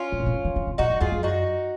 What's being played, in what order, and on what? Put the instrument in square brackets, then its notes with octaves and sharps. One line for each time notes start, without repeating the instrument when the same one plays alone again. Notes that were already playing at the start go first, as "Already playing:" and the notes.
Already playing: [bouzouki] C#4 F4
[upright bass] G#2
A#2
C3
C#3
D#3
C#3
C3
[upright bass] A#2 [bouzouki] D#4 F#4
[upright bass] F2
[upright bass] F2 [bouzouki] F4 G#4
[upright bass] F#2
[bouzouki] D#4 F#4